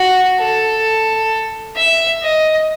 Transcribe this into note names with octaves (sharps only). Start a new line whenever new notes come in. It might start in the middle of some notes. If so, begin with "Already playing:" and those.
Already playing: F#4
A4
E5
D#5